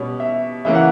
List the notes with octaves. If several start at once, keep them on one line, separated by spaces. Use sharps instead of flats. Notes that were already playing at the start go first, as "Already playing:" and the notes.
Already playing: B2 G3 C#4
E5
C#3 E3 A#3 C#4 E5
F#5